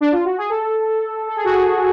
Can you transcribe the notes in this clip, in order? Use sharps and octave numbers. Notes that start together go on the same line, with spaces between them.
D4
F4
F#4
G#4
A4
A4
G#4
F#4
G#4